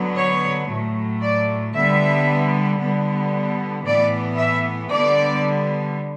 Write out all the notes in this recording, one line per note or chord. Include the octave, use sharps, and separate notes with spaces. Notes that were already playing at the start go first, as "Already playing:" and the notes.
Already playing: D3 F#3 B3
C#5
A2 F#3 A3
D5
D3 G3 B3 E5
D3 G3 B3
A2 E3 B3 D5
E5
D3 G3 B3 D5